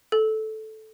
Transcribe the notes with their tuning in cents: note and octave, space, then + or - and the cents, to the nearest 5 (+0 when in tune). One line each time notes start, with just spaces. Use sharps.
A4 -10